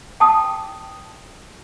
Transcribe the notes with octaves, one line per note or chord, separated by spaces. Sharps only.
G5 A5 D#6